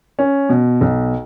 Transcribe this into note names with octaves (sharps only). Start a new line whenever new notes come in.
C#4
B2
B1